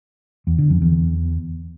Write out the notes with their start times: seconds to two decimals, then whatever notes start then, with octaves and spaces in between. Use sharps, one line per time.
0.47 E2
0.58 D3
0.70 F2
0.82 E2